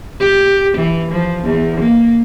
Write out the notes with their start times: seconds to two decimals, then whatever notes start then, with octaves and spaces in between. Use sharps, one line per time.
0.20 G4
0.77 E3
1.12 F3
1.44 E2
1.81 A#3